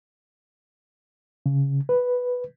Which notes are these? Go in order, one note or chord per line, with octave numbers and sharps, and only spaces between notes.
C#3
B4